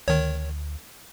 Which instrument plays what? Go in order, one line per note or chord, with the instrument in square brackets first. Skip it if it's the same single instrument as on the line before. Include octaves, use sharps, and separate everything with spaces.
[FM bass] D2 [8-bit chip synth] D#3 C#5